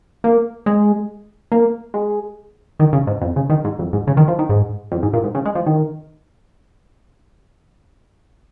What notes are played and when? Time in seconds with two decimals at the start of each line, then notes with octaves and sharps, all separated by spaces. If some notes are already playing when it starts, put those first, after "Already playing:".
0.24 A#3
0.66 G#3
1.52 A#3
1.94 G#3
2.79 D#3
2.93 C#3
3.07 G#2
3.22 F2
3.36 C#3
3.50 D#3
3.64 G#2
3.79 F2
3.93 G#2
4.07 C#3
4.17 D#3
4.28 F3
4.39 D#3
4.49 G#2
4.92 F2
5.03 G#2
5.13 A#2
5.24 G#2
5.35 C#3
5.46 G#3
5.55 F3
5.67 D#3